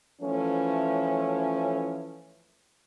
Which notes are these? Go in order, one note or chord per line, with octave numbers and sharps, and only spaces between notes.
E3 F3 A3 C#4